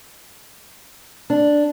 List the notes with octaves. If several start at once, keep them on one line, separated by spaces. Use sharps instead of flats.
D4